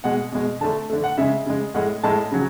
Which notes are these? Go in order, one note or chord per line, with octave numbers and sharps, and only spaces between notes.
B2 G#3 F#5
B2 G#3
D3 A3 A5
D3 A3
F#5
C#3 G#3 E5
C#3 G#3
A2 G#3 F#5
A2 G#3 A5
C#3 F#3